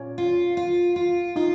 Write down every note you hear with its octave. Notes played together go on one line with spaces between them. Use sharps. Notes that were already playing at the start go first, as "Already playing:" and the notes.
Already playing: A#2 C#4
F4
F4
F4
D#4 F4